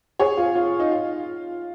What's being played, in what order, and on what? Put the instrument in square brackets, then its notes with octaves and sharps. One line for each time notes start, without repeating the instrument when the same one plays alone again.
[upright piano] G#4 C#5
F4
F4
D#4
F4